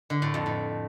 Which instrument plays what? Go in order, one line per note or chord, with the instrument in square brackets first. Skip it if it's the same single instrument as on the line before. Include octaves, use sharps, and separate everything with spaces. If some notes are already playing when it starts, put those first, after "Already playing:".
[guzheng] D3
A2
F2
A2